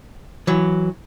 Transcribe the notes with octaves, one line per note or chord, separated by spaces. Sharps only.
E3 F#3